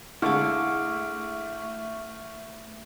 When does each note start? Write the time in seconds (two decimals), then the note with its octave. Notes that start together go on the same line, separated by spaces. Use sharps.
0.22 D3 G#3 A3 E4 F5 C#6 F6